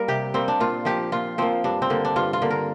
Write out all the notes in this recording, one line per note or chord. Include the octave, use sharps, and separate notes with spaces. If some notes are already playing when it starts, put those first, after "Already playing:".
Already playing: G3 A#3 A#4
C3 G4
G3 A#3 C4
D4
A#2 F4
F3 A#3 G4
A#2 F4
F3 A#3 C4
G2 D4
C4
D3 A#3
D4
G2 F4
F4
D3 A#3
A#4